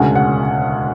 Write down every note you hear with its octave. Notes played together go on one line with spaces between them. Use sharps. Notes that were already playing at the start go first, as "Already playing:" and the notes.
Already playing: E1 D2 C#3 G#3 F#5
F#5